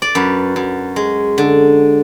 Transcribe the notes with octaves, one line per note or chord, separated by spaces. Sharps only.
D5
F#2 B4
F#2
G#3
D3